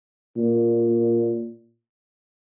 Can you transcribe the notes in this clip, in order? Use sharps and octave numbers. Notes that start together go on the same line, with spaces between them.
A#2